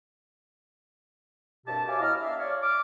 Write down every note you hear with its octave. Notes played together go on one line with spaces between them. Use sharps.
C2 G2 B2 G4 A5
C#5 E5 F5 G#5 D6
A2 B3 E4 D#5 A#5 F6
D4 E5 F5
C#5 D5
D6 F6